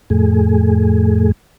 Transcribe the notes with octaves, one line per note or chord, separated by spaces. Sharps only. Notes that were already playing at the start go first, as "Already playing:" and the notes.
F2 A2 A3 G#4